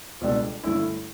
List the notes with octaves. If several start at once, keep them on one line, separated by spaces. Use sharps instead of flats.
C#2 B2 G3 D4 A4
G2 D3 A3 C#4 E4